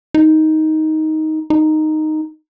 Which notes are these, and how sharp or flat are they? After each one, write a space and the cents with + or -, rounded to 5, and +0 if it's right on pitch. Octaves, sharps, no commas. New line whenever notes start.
D#4 +10
D#4 -5